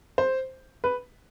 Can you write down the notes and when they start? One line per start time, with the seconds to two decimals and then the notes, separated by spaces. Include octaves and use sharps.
0.18 C5
0.84 B4